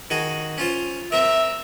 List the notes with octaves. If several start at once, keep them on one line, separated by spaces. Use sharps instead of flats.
D#3 F#4 G#4
C#4 F4 C5
C4 A#4 E5